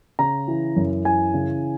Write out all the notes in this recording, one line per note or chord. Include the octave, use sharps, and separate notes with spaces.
C#3 A#5
E3
F#2
E3 G#5
C#3